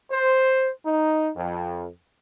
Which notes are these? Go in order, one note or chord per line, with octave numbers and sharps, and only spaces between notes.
C5
D#4
F2